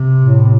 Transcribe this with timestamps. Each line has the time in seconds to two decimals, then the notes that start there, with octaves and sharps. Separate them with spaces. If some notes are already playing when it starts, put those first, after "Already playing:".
Already playing: C3
0.19 A2